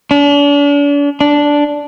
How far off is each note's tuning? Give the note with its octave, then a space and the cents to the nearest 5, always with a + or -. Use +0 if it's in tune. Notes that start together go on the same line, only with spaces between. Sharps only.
D4 -40
D4 -5